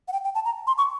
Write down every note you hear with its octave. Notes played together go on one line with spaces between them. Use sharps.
F#5
G5
G5
A5
A#5
C6
C#6